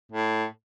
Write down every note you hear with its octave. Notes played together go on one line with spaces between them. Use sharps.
A2